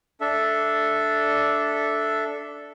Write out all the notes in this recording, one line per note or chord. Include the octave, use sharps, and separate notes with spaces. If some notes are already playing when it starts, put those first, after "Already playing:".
D4 A4 E5